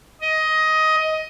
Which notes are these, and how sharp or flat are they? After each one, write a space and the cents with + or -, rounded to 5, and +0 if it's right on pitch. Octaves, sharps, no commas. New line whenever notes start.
D#5 +15